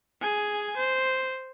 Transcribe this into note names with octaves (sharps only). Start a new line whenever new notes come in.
G#4 G#5
C5